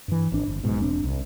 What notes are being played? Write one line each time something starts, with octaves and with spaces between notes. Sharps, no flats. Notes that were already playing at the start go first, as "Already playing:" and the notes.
G2 E3
G#1 D4
G1
E1 B1 G#2 B2
E1 C4 D4
C2